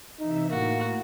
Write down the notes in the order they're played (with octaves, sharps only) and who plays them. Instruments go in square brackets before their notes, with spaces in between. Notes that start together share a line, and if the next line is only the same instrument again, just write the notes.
[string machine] C3 E3 E5 [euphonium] D#4
[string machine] A2 [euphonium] A#3 [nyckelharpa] F#4